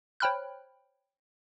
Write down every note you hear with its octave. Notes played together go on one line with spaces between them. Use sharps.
C5 C#5 G5 B5 F6 F#6